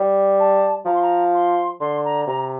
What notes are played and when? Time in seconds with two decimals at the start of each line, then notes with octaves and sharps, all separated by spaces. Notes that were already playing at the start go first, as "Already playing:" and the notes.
Already playing: G3
0.39 A5
0.86 F3 A#5
0.94 C6
1.02 A#5
1.34 C6
1.80 D3 C6
2.04 A#5
2.27 C3 A#5